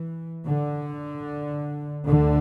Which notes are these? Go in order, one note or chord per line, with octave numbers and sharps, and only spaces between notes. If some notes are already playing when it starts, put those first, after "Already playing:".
Already playing: E3
D3
D2 D3